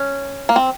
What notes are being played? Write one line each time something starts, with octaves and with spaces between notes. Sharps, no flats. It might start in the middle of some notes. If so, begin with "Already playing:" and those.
Already playing: C#4
A#3
C4